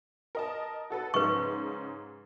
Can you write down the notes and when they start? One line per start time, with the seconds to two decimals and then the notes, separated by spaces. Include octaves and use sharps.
0.35 A#4 D#5 A5
0.90 F#4 A4 B4
1.14 G#2 C#3 B4 C#6